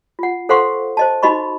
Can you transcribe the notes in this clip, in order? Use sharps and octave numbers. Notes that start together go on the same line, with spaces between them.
F4 F#5
A4 C5 F5 F#5 C6 C#6
C5 D#5 A5
D#4 F#4 D#5 B5 C#6